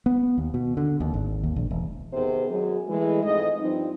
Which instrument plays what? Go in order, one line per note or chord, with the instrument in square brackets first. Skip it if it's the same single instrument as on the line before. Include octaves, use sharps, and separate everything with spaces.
[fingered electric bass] B3
D#2
B2
D3
D#2
G#1
D#2
A#1
E1
[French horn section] C3 D#3 B3 G#4 C5
F#2 F#3 G#3
E3 G#3 A3
F2 G#2 A3 D#5
G2 F3 G3 C4 D#4